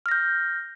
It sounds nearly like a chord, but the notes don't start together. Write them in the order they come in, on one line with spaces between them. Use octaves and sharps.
F6 A#6 G6